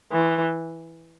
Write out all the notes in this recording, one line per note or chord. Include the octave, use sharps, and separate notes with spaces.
E3